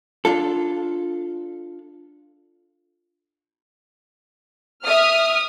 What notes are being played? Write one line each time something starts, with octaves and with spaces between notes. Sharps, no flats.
D4 F4 A4
E5 D#6 F6